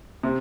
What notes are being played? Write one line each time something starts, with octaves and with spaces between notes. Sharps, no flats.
C3